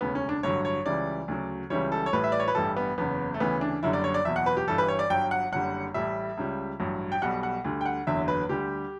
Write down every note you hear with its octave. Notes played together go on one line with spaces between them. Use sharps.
E1 D2 C#3 B3
C#4
D4
A1 G2 D3 F#3 C#5
C#5
C#2 C#3 E3 G3 D5
D2 C#3 F#3
C#2 C#3 E3 G3 C#5
A4
C#5
A1 A2 G3 B4
E5
D5
C#5
B4
A1 G2 E3 G3 A4
B3
F#1 E2 C#3 B3
A3
D2 C#3 E3 B3
D4
F#1 F#2 D3 G3 E4
D5
C#5
D5
F#1 E2 B2 E5
F#5
B4
G4
G1 G2 E3 G3 A4
B4
C#5
D5
G1 G2 F#3 G5
F#5
F#1 F#2 D3 G3 F#5
A1 A2 G3 E5
C#2 C#3 G3
A1 G2 F#3
G5
B1 B2 G3 F#5
F#5
D2 D3 G3
G5
F#5
F#1 E2 D3 F#3 E5
B4
D2 D3 G3 G4